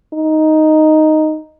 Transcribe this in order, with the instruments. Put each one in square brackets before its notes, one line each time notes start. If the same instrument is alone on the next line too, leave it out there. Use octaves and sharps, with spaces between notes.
[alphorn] D#4